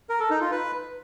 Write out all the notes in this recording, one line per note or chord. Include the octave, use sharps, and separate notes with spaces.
A#4
A4
D#4
F4
B4